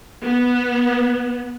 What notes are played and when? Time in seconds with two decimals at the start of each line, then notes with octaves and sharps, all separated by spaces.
0.25 B3